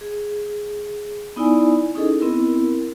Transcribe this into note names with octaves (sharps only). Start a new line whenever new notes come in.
G#4
B3 D#4 E4 D5 G#5
C#4 D#4 E4 G#4 A4 D#5
B3 C4 E4 A#4